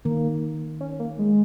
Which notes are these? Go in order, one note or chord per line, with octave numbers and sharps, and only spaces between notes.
D#3 A#3
C#4
A#3
G#3